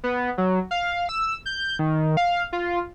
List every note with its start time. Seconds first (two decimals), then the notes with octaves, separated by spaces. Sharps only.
0.04 B3
0.38 F#3
0.71 F5
1.09 E6
1.46 G6
1.79 D#3
2.17 F5
2.53 F4